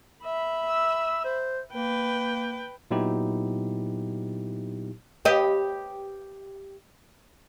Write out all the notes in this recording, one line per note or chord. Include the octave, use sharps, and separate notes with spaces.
E5 B5
E6
C5
A#3 B4 G5
A#2 F#3 B3 D#4 E4 G4
G4 B4 D#5